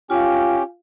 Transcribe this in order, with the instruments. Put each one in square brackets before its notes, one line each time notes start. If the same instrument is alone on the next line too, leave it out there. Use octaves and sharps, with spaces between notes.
[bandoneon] C#4 G4 [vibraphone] F4 F5